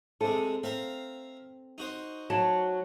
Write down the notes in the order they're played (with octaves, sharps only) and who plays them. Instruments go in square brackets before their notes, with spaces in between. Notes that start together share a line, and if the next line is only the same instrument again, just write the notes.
[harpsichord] C3 G#3 [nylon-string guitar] A4
[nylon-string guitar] C4 [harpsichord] E5 F5 A#5
[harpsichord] D#4 F#4 C5
[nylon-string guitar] F#3 [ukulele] A5